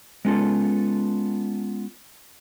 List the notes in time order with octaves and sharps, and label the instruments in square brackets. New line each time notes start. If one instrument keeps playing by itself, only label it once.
[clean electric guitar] G#3 B3 C#4 F4 A4